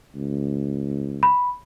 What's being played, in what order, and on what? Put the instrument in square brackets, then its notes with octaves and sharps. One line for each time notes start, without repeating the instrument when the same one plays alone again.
[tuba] C#2
[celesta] B5